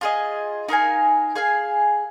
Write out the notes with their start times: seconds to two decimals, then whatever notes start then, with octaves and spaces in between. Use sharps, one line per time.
0.01 F4 G#4 D#5
0.68 D#4 A#4 F5 G#5
1.35 G#4 F5 G#5